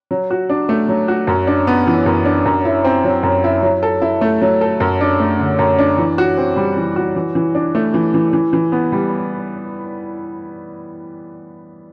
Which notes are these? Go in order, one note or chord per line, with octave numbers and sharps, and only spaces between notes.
F#3
F#4
D4
A3
F#3
F#4
F#2
D4
B3
E3
F#2
D4
F#2
E4
C4
F#3
F#2
E4
F#3
A4
E4
A3
F#3
A4
F#2
D4
A3
D3
F#2
D4
E3
F#4
C4
G3
E3
F#4
E3
E3
D4
A3
E3
E3
E3
E3
B3
G3